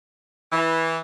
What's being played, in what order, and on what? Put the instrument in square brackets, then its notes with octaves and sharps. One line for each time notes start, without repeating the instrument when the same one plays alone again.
[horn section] E3